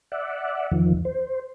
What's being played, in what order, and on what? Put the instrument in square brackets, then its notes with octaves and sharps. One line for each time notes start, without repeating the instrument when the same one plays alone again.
[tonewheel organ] D5 E5 F#5
E2 D#3 F3
C5